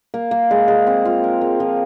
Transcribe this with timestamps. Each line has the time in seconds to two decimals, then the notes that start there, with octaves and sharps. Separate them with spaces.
0.14 A#3
0.31 A#3
0.51 G#3
0.68 G#3
0.87 C4
1.05 F4
1.24 A#4
1.41 A#3
1.60 F3